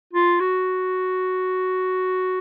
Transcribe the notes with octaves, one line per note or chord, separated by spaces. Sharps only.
F4
F#4